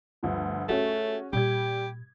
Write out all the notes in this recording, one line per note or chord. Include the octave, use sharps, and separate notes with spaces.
G1 D2 F3
A3 C#4 F4 F#4 G#4
A#2 G3 G4 G#6